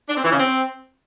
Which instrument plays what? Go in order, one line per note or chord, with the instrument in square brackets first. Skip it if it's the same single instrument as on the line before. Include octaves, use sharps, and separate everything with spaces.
[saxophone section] D4
C4
E3
C#3
C4